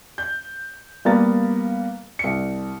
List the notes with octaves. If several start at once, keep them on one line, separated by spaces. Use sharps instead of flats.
G6
G3 A#3 B3 F5 A#5 A6
C2 C#7